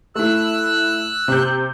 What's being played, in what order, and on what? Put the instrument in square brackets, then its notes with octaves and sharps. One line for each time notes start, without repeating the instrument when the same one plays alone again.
[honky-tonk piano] A3 E4 [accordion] E6 F#6
[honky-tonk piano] C3 G6